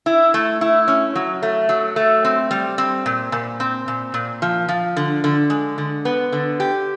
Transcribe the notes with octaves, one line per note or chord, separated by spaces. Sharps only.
E4
A3
E4
C#4
F#3
A3
F#3
A3
C4
G3
C4
A#2
A#2
C4
A#2
A#2
F3
F3
D3
D3
G#3
D3
B3
D3
G4